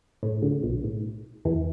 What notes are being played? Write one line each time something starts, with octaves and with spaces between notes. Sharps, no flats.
A2
D2 D3
B1 B2
A2
E2 E3